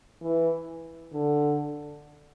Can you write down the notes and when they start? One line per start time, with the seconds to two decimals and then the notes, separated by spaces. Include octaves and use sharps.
0.21 E3
1.13 D3